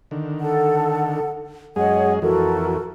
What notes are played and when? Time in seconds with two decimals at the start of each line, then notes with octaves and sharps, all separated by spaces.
0.11 D3 D#3
0.41 A4 F#5
1.76 F#2 G#3 G#4 C#5 D#5 F#5
2.22 F2 E3 F#4 A4 A#4